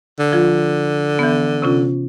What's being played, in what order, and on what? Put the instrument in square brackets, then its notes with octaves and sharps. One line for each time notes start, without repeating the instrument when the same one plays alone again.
[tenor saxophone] D3
[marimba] F3 F4
E3 B3
C3 C#4 F4